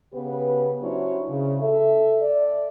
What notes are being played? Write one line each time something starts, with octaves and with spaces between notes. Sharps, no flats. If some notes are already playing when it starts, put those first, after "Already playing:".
C#3 B3 G4 B4
F#3 C#4 D4 E4 C5 C#5
C#3
A4 E5
D5